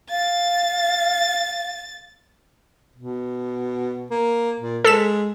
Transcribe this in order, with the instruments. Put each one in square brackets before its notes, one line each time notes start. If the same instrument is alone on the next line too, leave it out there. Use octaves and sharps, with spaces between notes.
[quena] F5 [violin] A6
[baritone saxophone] B2
A#3
A#2
[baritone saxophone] G#3 [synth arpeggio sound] A4 B6 E7